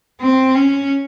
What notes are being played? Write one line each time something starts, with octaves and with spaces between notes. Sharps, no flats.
C4
C#4